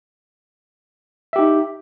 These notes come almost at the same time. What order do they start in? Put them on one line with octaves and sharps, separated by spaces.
E5 G4 D#4